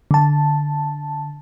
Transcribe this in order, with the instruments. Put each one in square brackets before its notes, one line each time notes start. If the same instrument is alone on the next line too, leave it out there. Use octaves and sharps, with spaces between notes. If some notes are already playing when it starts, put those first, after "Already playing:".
[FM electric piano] D3 A5